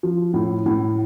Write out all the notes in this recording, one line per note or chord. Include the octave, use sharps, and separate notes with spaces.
F3
A2
A2